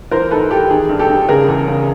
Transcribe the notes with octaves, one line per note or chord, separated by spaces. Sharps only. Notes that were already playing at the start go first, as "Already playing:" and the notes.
E3 A#4 C5
G#2 A4 B4
E3 G4 A4
D#3 G#4
G2
G4 A4
G2
C#3 G#4 A#4
E2
C#3